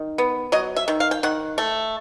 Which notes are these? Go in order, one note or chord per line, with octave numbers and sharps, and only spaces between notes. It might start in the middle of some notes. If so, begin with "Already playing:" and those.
Already playing: D#3
B3
F#3 D#5
E5
D#3
F5
G5
D#3 F#5
A3